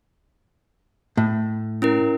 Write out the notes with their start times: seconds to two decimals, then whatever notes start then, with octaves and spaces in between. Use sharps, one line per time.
1.17 A2
1.82 C#4 E4 A#4